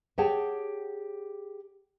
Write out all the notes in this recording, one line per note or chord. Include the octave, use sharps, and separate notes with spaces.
G4 G#4 C#5 F#5 G5 A5